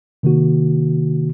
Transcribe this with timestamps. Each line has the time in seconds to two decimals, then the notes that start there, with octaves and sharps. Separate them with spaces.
0.23 C3 D#3 A#3 F#4